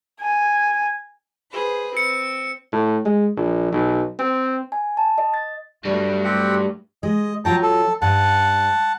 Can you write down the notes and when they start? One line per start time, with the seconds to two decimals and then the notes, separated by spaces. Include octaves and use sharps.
0.20 G#5
1.50 G#4 B4 C5
1.97 C4 C#7
2.73 A2
3.05 G#3
3.36 A#1
3.72 B1
4.19 C4
4.72 G#5
4.97 A5
5.18 D#5
5.34 A6
5.85 G2 F#3 G3 A3 F#4
6.24 C4 G4 F#5
7.03 G#3 D#5
7.45 F#3 F4 C#5 G5 A5 A#5
7.62 A4
8.02 G2 F#5 A5